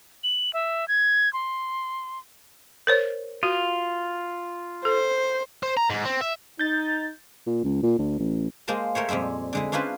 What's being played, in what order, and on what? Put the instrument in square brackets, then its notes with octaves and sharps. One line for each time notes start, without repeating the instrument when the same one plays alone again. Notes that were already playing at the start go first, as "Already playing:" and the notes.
[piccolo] F#7
E5
G#6
C6
[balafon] A#4 C5 C#5
[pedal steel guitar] F4 [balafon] F#4
[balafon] A4 [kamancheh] C5
[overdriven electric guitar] C5
A#5
G#2
C4
E5
[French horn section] D#4 [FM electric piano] G6 A6
[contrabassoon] A#2
C#2
A#2
D2
A1
[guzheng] G#3 A#3 A#4 C5 A5
A3 A#4 C5 C#5
F2 A#2 G3 G#3 E5
D3 G#3 E4
C#4 D4 E4 F4 B4 C5